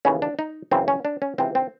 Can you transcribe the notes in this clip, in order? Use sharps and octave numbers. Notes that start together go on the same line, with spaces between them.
D#2 C#3 E3 C#4
D4
D#4
F#2 C#3 E3 C4
C#4
D4
C#4
C#2 C3 E3 C4
C4